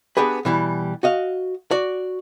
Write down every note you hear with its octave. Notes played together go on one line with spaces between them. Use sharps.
B3 D4 G4 G#4 B4
B2 E3 G3
F#4 D#5 F5
F#4 D5